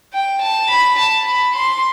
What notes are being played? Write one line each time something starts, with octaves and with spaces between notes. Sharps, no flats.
G5
A5
B5
A5
B5
C6